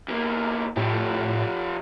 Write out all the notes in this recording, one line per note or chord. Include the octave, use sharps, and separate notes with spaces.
E2 A#3
A2 F3 G4